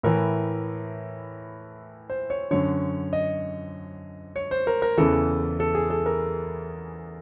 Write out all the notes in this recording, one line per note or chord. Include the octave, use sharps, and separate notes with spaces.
A2 E3 A#4
C5
C#5
F#2 D3 C#5
D#5
C#5
C5
A#4
A#4
E2 C#3 E3 A4
A4
G#4
A4
A#4